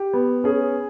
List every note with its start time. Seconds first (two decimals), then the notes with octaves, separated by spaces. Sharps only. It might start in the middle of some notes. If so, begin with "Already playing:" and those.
Already playing: G4
0.13 B3
0.44 C#4 G#4